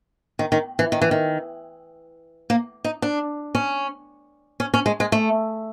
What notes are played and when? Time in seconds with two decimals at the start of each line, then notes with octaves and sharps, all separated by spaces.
0.39 D#3
0.52 D#3
0.79 E3
0.92 D#3
1.01 E3
1.11 D#3
2.50 A#3
2.84 D#4
3.02 D4
3.55 C#4
4.60 C#4
4.74 C#4
4.86 G#3
5.00 G#3
5.12 A3